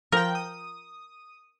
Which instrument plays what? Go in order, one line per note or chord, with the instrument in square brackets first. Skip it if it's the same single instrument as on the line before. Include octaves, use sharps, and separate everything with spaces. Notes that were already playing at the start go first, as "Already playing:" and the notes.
[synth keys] F3 G5 [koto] A#4
[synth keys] D#6